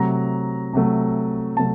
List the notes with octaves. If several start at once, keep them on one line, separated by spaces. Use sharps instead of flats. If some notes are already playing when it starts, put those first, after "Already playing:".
Already playing: C3 F#3 A3 A#5
C3 F#3 A3
C3 F#3 A3 A5